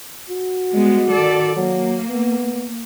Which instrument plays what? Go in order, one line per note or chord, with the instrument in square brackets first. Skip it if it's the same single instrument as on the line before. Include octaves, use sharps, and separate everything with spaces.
[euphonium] F#4
[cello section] G3 G#3 B3
D#3 A4 D5
[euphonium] F#3 [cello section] A#3
[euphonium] B3